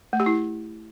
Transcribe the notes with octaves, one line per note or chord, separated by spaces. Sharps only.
A3
G4
E4